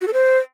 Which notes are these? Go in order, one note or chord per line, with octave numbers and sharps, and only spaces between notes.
F#4
A4
C5